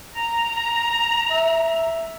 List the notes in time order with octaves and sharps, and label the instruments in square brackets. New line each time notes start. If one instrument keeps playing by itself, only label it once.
[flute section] A#5
[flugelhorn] E5